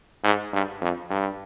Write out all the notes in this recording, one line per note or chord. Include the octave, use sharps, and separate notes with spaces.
G#2
G2
F2
G2